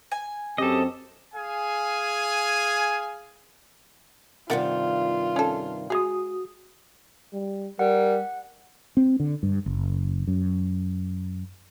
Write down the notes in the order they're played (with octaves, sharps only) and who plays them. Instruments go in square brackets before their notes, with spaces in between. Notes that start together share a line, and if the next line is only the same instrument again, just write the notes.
[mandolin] G#5
[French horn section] F#2 C4 [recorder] G4 [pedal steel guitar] A4 D#5
[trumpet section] G#4 F5 G#5
[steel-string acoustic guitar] G2 C3 D#3 [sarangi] F4 [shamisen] A#4 D5 F#5
[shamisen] C#4 A4
[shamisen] G#3 G#4 [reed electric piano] F#4 D#6
[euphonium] G3
[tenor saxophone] G3 [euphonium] A#4 [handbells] F#5
[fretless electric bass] C4
D3
G2
F#1
F#2